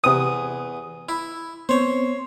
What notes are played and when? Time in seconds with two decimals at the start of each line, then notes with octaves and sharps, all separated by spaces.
0.04 E2 C3 D#6
1.09 E4
1.69 B3 C4 C5 C#5